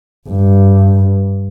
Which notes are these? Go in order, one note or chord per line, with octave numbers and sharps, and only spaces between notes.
G2